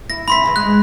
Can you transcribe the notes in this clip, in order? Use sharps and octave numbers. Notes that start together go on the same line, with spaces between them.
E4 A#6
C4 E4 B5 C6 B6
D#2 C#3 E3
G#2 G#3 C#4 F#6